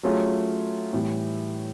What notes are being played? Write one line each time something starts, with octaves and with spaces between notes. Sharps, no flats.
F#3 A3 C#4 F4 G#4
A2 E3 G3